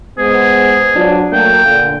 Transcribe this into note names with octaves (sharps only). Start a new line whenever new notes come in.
G#3 B3 G#4 C5
F#3 D4 F4
F#3 A3 A#3 G5
A#2 D3